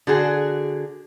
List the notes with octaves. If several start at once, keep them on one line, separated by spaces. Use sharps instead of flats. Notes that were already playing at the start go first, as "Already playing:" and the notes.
D3 F#4 G#4